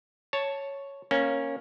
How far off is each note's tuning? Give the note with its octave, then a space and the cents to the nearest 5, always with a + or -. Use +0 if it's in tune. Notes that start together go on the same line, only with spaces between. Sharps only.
C#5 +0 A5 +0
A#3 +0 C#4 -10